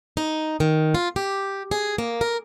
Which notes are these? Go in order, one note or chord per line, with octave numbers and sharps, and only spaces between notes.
D#4
D#3
F4
G4
G#4
A#3
A#4